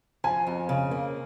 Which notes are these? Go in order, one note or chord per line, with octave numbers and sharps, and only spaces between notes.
F3 G#5
F2
C#3
A#3